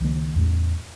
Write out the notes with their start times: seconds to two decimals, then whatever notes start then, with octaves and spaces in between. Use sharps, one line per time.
0.01 C#2 D#3 F3 A#3
0.36 E2 A2 A3